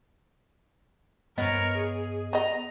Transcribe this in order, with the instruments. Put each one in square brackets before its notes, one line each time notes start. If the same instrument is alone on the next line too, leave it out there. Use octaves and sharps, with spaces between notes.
[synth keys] G2 D#5 [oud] B3 [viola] A#4 C#5
[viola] G#4
[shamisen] B3 D#5 [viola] A#5